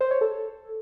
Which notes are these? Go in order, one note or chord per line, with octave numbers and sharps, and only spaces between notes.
C5
C#5
A4